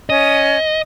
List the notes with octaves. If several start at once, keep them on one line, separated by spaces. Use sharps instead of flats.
C#4 D#5